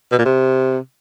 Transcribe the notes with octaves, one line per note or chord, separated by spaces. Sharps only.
B2
A#2
C3